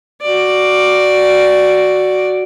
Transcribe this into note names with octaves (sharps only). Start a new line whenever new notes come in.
F#4 D5